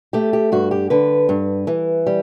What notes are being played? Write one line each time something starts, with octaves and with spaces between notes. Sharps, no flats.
A3 G4
G4
G2 F#4
G4
D3 B4
G2
E3
G3